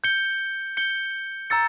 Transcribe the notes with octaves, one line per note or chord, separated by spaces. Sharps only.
G6 C#7 G7
G6 C#7 G7
A#5 E6 A6 C#7